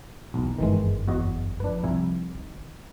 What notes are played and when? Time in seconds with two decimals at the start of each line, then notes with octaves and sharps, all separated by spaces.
0.34 B1 E2 D#3
0.58 G1 F#2 D#3 E3 G#3
1.08 E2 F#4 D#5
1.60 F3 D4 B4
1.84 C2 E4 G#5
2.35 D#3